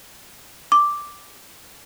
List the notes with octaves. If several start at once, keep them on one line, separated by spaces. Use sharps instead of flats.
D6